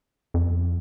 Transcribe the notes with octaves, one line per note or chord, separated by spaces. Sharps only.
F2